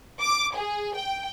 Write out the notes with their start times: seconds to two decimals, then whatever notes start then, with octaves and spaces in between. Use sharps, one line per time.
0.22 D6
0.56 G#4
0.96 G5